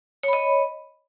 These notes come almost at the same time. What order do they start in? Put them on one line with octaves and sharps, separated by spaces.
C#5 B5 D#5